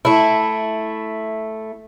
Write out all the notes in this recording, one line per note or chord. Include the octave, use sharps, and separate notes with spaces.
A3 E4